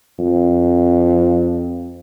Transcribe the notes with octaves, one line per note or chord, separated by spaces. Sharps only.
F2